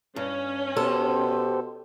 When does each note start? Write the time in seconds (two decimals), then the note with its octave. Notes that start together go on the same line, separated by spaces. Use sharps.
0.16 G2 C#4
0.77 B2 G4 A4 C5